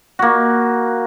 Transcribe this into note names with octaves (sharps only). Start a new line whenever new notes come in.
A#3 F#4